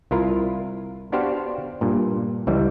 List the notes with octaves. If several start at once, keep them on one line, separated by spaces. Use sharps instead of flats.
C2 E4 F4 A#4
B3 D4 F#4 G4 C5 F5
G2 A#2
C#2 E3 G3